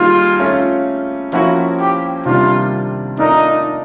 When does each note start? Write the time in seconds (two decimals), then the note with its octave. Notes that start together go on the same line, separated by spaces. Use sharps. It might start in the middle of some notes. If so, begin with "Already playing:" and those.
Already playing: D#3 G3 A#3 D#4 F4 G#4
0.39 A3 C#4 F4
1.33 F3 A#3 C#4 E4 F#4
1.79 G4
2.25 C3 D#3 G3 A#3 D4 F4
3.19 A3 D4 D#4 F4 A#4 D5